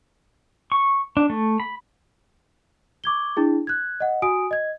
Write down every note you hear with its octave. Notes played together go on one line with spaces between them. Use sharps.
C#6
D4
A3
B5
C#6 D6 G#6 G7
D4 E4 G#4
F#6 G#6
D#5 F#5
F#4 G#5 D#6 D7
D#5 G#6